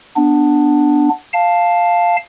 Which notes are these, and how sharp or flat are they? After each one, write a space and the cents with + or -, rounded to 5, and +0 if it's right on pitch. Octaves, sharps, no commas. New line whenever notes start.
B3 +0 D4 +5
F5 +0 A5 +0